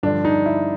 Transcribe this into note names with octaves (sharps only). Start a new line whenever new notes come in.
G2 D3 F3 D4
D#4
E4